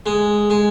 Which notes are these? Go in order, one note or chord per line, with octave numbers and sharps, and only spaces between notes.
G#3
G#3